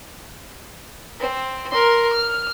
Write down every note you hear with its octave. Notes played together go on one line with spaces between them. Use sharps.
C4
A#4 C6
F6